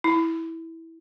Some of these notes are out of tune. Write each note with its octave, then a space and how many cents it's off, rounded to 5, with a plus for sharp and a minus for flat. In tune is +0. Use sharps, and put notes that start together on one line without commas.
E4 -10